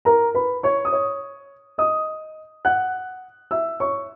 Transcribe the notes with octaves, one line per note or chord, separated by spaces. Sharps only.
A#4 A#5
B4 B5
C#5 C#6
D#6
C#5 C#6
D#5 D#6
F#5 F#6
E5 E6
C#5 C#6